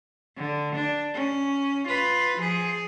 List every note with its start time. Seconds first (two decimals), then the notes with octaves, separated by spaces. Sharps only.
0.37 D3
0.75 D4
1.14 C#4
1.87 F4 B4
2.37 F3 G#4